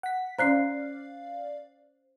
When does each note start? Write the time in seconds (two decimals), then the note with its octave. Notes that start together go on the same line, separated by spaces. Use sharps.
0.03 F#5 B6
0.39 C#4 C5 D5 F5 A#5 F#6 C7